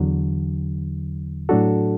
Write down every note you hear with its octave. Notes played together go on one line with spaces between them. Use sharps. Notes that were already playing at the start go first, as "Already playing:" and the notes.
Already playing: E2 D3 F#3
A2 F#3 D4 F#4 A4